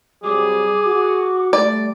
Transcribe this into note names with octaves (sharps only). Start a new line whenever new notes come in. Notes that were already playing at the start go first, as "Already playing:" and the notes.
C3 F#3 G3 G#4 D6
F#4
G3 A3 D5